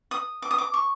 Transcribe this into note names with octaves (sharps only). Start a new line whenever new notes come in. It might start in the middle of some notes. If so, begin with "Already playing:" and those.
D#6
D6
D#6
D6
C#6